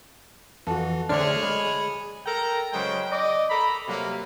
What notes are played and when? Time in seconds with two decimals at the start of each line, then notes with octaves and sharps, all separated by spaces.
0.67 F2 E3 F#4 A4
1.09 D3 A3 D4 G#4 C5 C#5 F6
1.43 G#3 B5
2.26 A4 A#4 G5 A#5
2.72 C#3 F#3 G#3 C5 G5
3.11 D5 D#5
3.50 A4 A#5 B5
3.88 C3 F#3 G3 A#3